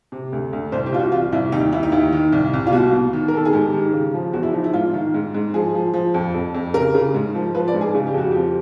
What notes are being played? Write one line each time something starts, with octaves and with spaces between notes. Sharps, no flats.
C3
D2
D2
C2 C5
G4
C2 F4
F#4
E3 F4
C2 E4
D#2 D#4
D#2 E4
D#4
D#2 E4
D#3
C2
C2
F4
B2 F#4
B2
D#3
A#4
D#3 A4
G#4
G#2 G4
D#3
C#3
F3
E2 F#4
E4
F3 D#4
E4
G#2 F4
D#3
G#2
G#2
F3 G#4
F3
F3
F2
F2
F2
C#3 A#4
C#3
G#2
F3
F3 B4
D5
G#2
G#4
C#3 G#4
G4
F2 F#4
F3 G4